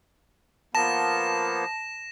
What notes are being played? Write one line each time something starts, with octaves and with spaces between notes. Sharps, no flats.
F3 A#3 B3 A5 A#6 E7